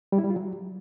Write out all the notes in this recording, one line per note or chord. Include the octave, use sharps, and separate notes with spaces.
G3
E4
G3
F4
F#3